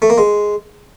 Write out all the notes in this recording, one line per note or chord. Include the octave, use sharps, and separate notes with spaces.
A3
A#3
G#3